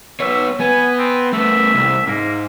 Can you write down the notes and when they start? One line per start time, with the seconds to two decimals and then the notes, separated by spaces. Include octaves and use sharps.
0.20 B3 C#5 E5
0.60 B3 G#5
0.98 C4
1.33 A3 B3 E5
1.75 C2
2.07 G#2 A#3